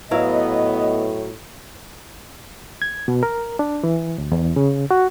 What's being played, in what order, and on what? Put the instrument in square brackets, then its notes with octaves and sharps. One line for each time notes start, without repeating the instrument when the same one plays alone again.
[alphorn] A2 [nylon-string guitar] F#3 E4 F5 [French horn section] B3 D#5
[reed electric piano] G#6
B2
A#4
D4
E3
D2
E2
C#3
F#4